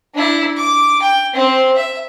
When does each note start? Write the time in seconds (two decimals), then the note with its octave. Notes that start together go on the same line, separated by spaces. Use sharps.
0.14 D4 E4
0.57 D6
1.02 G5
1.34 C4 C5
1.75 E5